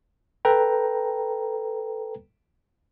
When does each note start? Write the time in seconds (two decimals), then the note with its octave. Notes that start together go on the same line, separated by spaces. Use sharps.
0.45 A4 B4 G5 A#5